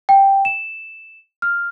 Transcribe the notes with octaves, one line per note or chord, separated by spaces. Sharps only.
G5
E7
F6